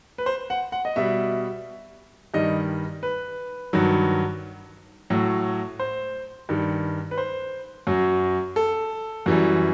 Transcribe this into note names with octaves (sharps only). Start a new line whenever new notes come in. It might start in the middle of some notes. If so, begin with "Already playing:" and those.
B4
C5
F#5
F#5
D#5
B2 G3 E5
G2 D#3 G3 D#5
B4
G2 D#3 F#3
A2 F#3
C5
G2 D#3 G3
B4
C5
F#2 F#3
A4
F#2 E3 G3